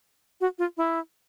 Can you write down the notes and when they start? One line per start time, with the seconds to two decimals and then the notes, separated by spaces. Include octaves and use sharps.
0.41 F#4
0.59 F4
0.77 E4